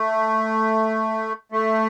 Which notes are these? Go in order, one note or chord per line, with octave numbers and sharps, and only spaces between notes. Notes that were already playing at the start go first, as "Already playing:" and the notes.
Already playing: A3
A3